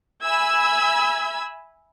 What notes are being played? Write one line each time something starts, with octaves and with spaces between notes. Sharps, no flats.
E5 G#5 B5 E6 G#6